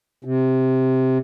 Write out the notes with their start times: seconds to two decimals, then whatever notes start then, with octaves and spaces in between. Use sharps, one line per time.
0.24 C3